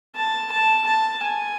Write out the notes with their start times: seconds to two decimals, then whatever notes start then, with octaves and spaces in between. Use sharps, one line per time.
0.16 A5
0.52 A5
0.86 A5
1.23 G#5